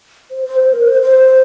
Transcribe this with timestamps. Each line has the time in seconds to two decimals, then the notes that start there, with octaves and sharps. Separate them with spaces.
0.31 C5
0.45 C5
0.59 C5
0.73 A#4
0.87 C5
1.02 C5